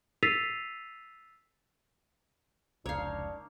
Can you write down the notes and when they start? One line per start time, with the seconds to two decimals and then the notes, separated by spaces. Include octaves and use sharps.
0.23 E6 A6 B6 C7 D#7 F7
2.86 F1 C#2 A#3 D4 D#4 C#5 F5